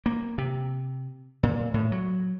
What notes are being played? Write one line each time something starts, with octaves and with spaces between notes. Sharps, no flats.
A#3
C3
A#2
A2
F#3